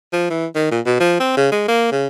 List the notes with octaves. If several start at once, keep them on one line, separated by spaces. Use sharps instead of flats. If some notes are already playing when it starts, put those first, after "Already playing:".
F3
E3
D#3
A#2
B2
F3
C4
C#3
G#3
A#3
C#3